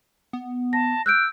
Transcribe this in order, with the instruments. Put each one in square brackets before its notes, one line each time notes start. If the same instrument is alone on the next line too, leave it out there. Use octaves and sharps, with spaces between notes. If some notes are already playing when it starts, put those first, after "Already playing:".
[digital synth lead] B3
[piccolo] A5 [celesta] A#6
[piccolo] E6 [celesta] F#6 G6 D7